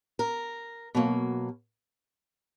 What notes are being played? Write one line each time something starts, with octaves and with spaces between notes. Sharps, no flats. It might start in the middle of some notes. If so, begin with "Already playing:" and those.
A#4
B2 F#3 A#3